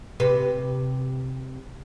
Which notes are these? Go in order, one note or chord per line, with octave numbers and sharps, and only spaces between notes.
C3 B4